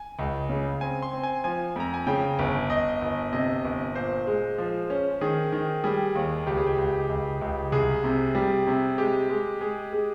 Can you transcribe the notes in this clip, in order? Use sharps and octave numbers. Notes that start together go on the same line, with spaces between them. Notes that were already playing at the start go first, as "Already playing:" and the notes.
Already playing: G#5
C#2
C#3
C4 G#5
C6
C4
G#5
F3 G#5
F2 A#5
G#5
C#3 G5
G1
G1 D#5
G1
C3 D#5
G1
A#2 C5
G#3
F3
C#4
D#3 G#4
D#3
G3 G#4
D#2
C#2 G4
G#4
G4
C#2
C#2
C#2
C2 G#4
C3
G3
C3
G#3 G4
G#3
G#3 G#4
G#3